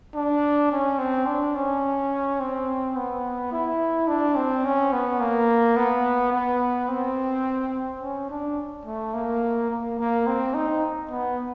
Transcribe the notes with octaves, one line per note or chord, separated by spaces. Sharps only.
D4
C#4
C4
D4
C#4
C4
B3
E4
D4
C4
C#4
B3
A#3
B3
B3
C4
C#4
D4
A3
A#3
A#3
A#3
C4
D#4
B3